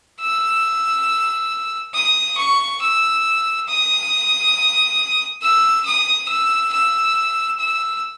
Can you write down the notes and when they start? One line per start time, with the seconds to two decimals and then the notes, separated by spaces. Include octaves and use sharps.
0.21 E6
1.94 D#6
2.37 C#6
2.82 E6
3.67 D#6
5.42 E6
5.86 D#6
6.28 E6
6.72 E6
7.60 E6